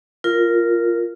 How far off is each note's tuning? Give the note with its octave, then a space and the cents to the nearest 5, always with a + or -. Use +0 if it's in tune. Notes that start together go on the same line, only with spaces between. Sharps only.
F4 -10 A#4 +0